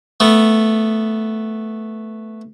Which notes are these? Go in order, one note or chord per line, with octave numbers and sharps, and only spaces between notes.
A3 B3